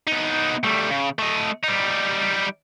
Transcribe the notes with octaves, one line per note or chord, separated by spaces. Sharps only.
B3 D#4
G3 A3
C#3
A3 D#5
G3 D#4